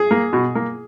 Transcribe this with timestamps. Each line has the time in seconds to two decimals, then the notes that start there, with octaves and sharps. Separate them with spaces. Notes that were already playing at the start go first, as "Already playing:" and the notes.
Already playing: G#4
0.11 A#3
0.33 B2
0.55 A#3